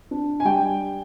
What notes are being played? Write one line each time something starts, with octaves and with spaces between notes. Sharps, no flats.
D4
G#5
G3 G5